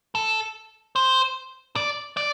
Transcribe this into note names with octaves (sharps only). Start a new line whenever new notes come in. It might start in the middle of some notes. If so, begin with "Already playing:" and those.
A4
C5
D5
D5